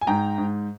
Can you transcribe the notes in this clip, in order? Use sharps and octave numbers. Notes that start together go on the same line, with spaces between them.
G#5
G#2 G5 A#5
G#2